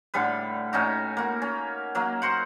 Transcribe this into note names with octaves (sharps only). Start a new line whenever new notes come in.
A2 D3 G3 B4
A2 C#4 D#4 F#4
A#3 F#4
C#4
F#3 A#3
F#4 C5 F#5